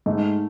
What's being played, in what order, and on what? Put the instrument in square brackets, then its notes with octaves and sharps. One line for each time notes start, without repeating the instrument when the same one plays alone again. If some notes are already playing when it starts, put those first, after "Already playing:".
[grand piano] G#2 [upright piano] A3